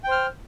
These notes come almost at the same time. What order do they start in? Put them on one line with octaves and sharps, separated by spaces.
G5 C5 F6